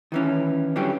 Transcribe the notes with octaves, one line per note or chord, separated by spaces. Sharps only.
D#3 E3 C#4
D3 E3 F#3 G3 C#4 G4